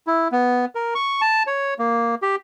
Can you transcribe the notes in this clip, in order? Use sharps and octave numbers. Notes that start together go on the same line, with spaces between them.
E4
B3
A#4
C#6
A5
C#5
A#3
G4